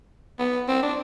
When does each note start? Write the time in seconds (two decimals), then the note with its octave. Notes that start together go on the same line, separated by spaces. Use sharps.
0.39 B3
0.68 C4
0.83 D4